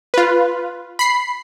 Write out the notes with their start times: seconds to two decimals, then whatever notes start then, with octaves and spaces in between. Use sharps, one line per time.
0.14 F4 B4
0.99 B5 C7